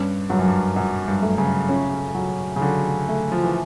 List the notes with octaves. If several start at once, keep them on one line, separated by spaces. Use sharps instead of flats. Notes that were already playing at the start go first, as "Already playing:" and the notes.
Already playing: G2 C#4
G2 F#3
F#2
G2
F#2 F#3
G2
A3
C#3
C#4
F#3
C#3
D3 F#3
A3
F3
E3